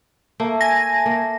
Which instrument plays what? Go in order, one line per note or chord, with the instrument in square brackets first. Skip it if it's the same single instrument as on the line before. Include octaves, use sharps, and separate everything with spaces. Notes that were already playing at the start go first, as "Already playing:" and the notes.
[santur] A3 [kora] A#3
[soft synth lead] G#5 [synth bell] A#6
[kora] A#3